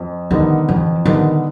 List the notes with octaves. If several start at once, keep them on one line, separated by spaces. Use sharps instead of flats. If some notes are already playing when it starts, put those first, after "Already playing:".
Already playing: F2
D3 D#3 G3 B3 D#4
F2 E3
D3 D#3 G3 B3 D#4